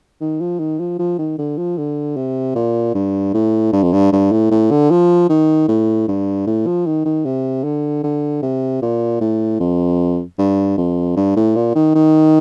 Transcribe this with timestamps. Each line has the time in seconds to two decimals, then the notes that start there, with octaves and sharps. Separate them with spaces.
0.21 D#3
0.40 F3
0.59 D#3
0.79 F3
0.99 F3
1.19 D#3
1.38 D3
1.57 F3
1.78 D3
2.16 C3
2.55 A#2
2.95 G2
3.34 A2
3.73 G2
3.83 F2
3.93 G2
4.12 G2
4.32 A2
4.51 A2
4.71 D3
4.90 F3
5.29 D#3
5.68 A2
6.08 G2
6.47 A2
6.66 F3
6.86 D#3
7.05 D#3
7.25 C3
7.64 D3
8.03 D3
8.42 C3
8.82 A#2
9.21 A2
9.60 F2
10.38 G2
10.77 F2
11.16 G2
11.36 A2
11.56 A#2
11.75 D#3
11.95 D#3